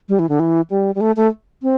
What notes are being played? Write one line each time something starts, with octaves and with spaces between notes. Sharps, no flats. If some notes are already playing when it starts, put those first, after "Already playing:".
G3
E3
D3
E3
G3
G3
A3
A3
C4